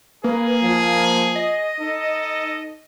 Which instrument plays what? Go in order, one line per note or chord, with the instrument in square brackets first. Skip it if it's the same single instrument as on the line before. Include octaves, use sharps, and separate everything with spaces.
[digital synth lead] A#3 [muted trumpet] G#4 [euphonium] B4
[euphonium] F3
[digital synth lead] D#5
[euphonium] D#4 [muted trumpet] A4